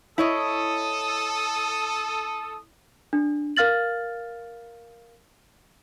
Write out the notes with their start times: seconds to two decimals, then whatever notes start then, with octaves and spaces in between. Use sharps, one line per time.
0.18 E4 A4 C#5 D#5 D#6
3.13 D4
3.57 A#4 F5 F6 A6 F#7